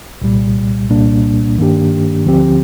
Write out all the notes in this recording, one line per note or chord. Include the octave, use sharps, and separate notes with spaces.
C2 A#2 G3
C2 A#2 G3 A#3 D4
G2 D#3 A#3 D4 G4
D2 D3 F3 C4 G4